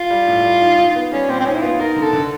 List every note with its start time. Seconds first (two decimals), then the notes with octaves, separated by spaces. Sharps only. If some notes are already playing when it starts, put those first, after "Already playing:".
Already playing: F4
0.11 G3
0.27 A2
0.44 G3
0.61 D#4
0.79 D#4
0.96 B3
1.12 G3 C#4
1.28 A#2 C4
1.40 C4
1.45 C#4 D#4
1.55 E4
1.62 B3 F4
1.80 D#4 A#4
1.96 D3
2.02 A4
2.13 D3